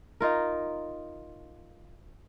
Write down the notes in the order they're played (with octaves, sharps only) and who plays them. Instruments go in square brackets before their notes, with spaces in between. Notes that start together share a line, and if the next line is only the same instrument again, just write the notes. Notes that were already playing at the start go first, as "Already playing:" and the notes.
[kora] D#4 F4 A#4